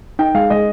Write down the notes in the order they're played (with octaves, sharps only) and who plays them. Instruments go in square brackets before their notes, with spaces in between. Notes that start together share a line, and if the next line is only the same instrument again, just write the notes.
[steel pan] D#4 [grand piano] G5
[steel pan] G#3 [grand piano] F5
[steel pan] G#3 [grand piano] D#5